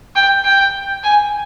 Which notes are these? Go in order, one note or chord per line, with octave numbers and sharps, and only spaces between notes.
G5
G5
G#5